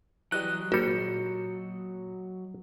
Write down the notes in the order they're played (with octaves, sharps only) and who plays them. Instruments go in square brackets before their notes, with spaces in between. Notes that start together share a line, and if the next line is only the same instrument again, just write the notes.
[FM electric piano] E3 G3 [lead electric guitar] F#3 D#5 [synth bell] F#6
[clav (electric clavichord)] G#1 G3 [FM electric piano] A#2 [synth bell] F#4 C#7